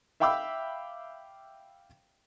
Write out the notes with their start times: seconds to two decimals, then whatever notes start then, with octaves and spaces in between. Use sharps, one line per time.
0.20 E5 F5 G5 B5 D6 E6